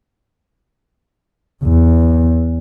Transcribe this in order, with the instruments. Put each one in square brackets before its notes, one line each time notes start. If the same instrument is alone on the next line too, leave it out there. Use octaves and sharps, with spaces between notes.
[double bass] E2